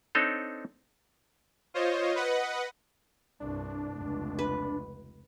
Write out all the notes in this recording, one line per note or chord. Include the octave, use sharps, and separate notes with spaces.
C4 D4 D#4 A4 C#5
F4 C5 C#5 D#5
B4 D#5 F#5
C2 G2 D4
F1 C#2
B4